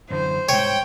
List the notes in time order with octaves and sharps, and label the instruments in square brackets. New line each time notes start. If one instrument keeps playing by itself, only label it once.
[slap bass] F#2 D3 E3 [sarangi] C5
[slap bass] C2 G#2 [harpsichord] C#5 [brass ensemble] G5